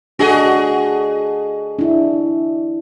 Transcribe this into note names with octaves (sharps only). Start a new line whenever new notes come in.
D4 F#4 G#4 A4 D#5
D4 E4